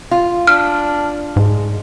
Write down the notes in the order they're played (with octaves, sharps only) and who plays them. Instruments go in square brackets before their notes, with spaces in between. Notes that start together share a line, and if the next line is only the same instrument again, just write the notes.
[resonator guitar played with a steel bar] F4
[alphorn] D4 [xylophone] F6
[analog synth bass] G#2 [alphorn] G#3